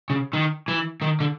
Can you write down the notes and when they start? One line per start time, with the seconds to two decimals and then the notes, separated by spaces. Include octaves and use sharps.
0.10 C#3
0.33 D#3
0.68 E3
1.02 D#3
1.20 D3